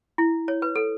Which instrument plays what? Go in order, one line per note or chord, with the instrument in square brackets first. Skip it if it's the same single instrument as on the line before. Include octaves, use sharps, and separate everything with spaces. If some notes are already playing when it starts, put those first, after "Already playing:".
[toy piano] E4
C#5
B4
A4